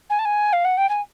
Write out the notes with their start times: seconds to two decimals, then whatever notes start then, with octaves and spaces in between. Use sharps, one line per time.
0.10 G#5
0.19 A5
0.25 G#5
0.53 F5
0.64 F#5
0.77 G5
0.89 G#5